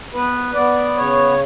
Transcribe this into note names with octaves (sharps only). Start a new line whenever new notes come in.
B3 B4
B3 D5
C#3 C#5